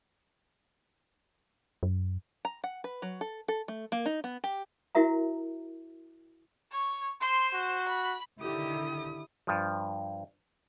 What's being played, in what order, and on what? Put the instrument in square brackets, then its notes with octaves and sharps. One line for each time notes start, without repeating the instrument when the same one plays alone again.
[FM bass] F#2
[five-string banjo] A#5
F#5
B4
F#3
A4
A4
A3
A#3
D#4
B3
G4
[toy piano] E4 F#4 A#4 E5 A#5
[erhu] C#5
[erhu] C5 [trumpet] C6
[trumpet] F#4
[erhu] B5
[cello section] D3 D#3 G4 [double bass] E4 [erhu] D#6
[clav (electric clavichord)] G2 F3